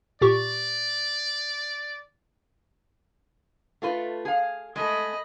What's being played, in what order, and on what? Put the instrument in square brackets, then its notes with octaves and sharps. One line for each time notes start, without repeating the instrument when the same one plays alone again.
[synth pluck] A#2 G4 C#6 [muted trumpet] D5
[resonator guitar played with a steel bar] A3 F4 B4
G#4 F5
[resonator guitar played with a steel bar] G#3 A3 [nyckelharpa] D#5 B5